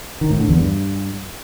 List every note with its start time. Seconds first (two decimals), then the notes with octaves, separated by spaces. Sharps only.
0.21 D#3
0.30 A2
0.39 D3
0.48 E2
0.57 G2